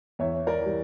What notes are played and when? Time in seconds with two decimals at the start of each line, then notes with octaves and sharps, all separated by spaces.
0.19 E2 C#5 E5
0.47 A#4 D5
0.60 E3 G3